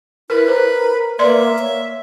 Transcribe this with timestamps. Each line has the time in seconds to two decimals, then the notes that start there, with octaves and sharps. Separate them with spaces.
0.30 E4 A#4 B4
0.48 A#4 C5
1.19 A#3 B4 D5 E5 C6
1.59 C#5